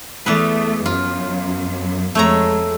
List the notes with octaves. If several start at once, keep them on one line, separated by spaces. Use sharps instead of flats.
E2 A3 B3 B4
F#2 F4
F2 G#3 A3 C#5 A#5